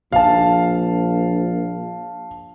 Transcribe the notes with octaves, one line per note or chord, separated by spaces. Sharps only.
A#1 F5 A5